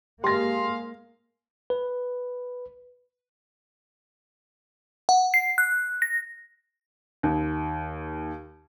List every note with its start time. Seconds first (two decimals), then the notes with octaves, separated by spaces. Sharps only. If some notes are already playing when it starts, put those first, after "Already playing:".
0.24 G#2 A#3 G4 G#4 F5 C6 A#6
1.70 B4
5.09 F#5
5.34 C7
5.58 F#6
6.02 A#6
7.23 D#2